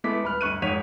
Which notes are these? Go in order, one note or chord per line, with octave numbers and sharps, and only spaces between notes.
G#3 A3 B3 E4 D6 B6
D#1 B4 B5 F6
G1 D2 C#6 F#6 D#7
F1 G#2 C#5 B6 D#7 F7